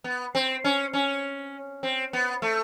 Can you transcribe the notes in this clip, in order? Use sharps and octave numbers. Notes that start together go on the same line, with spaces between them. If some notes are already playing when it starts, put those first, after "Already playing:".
B3
C4
C#4
C#4
C4
B3
A3